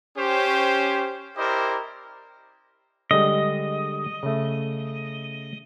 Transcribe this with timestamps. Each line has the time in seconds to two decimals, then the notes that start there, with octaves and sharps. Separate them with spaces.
0.18 C#4 G4 C5
1.37 E4 G4 A#4 C5 D5 D#5
3.11 D3 G3 G#3 D#5
4.23 C#3 A3